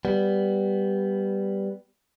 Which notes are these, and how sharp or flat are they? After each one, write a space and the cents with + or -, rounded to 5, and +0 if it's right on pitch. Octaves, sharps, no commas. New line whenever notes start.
G3 +0 B3 +0